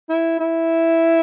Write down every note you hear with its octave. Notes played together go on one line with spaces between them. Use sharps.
E4
E4